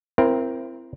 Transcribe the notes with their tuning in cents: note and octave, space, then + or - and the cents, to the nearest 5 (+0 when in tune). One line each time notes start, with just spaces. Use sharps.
C4 +0 E4 +30 A#4 +15